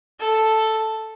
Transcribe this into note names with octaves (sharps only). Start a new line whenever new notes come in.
A4